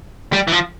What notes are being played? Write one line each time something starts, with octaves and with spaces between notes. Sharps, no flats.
G3
E3
F3